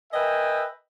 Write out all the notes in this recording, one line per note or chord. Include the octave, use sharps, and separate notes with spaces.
A#4 B4 D#5 E5 G5 G#5